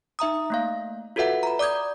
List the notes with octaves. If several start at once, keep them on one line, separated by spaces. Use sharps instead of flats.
D#4 E5 A#5 D#6
A3 A#3 F5
F4 F#4 A4 B4 E5 F#5
A#5 B5
D5 D6 D#6 G6 G#6